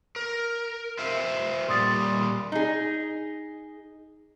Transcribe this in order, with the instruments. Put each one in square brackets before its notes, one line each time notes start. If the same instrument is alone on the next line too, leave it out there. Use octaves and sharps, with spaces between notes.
[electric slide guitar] A#4
F4 C5 E5
[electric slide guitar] A#2 G3 [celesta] C6 D#6 A6
[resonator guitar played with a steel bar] D#4 G#4